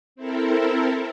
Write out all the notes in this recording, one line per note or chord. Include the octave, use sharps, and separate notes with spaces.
C4 E4 A4 A#4